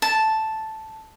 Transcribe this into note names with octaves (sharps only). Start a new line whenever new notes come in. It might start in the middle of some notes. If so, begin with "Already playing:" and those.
A5